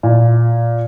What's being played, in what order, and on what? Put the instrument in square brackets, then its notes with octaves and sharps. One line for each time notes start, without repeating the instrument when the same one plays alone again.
[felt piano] A#2